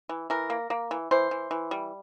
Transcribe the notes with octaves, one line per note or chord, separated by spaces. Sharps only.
E3
E3 A#4
A#3
A#3
E3
E3 C5
E3
E3
G3